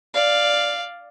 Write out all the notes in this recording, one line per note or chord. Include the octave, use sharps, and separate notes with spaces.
D5 F5